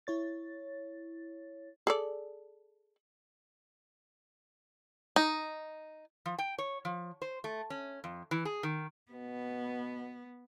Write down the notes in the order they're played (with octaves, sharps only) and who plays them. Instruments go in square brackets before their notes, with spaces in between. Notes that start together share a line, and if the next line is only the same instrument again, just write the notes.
[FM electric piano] E4 C#5 A6
[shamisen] G#4 A4 D5
[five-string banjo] D#4
[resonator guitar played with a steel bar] F3
G5
C#5
F3
C5
A3
C#4
F2
E3
G#4
D#3
[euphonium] B2 [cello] B3